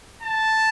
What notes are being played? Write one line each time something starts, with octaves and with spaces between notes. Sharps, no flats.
A5